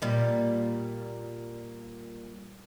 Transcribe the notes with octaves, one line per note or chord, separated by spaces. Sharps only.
A#2 G3